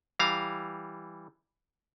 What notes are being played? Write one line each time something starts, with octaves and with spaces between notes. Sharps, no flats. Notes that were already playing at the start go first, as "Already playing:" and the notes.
E3 G3 F5 A#5